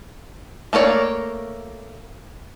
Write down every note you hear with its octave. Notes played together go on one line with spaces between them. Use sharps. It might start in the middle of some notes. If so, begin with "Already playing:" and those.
A3 A#3 A#4 C#5 D5